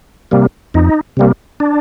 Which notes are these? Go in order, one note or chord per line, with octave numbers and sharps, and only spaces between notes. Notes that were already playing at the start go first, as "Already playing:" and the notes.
C3 G3 A#3
F2 D#4
C3 G3 A#3
D4